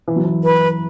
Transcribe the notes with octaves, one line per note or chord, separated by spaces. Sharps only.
E3
F#3
E3
B4